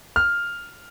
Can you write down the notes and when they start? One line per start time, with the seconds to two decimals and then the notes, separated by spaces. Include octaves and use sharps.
0.16 F6